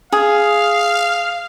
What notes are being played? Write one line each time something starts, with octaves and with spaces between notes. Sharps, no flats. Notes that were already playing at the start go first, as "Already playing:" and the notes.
G#4 F5